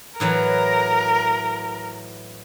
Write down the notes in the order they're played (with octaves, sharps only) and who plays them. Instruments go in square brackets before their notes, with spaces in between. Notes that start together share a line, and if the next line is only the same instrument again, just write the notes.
[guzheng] A2 E3 F#3 [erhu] A#4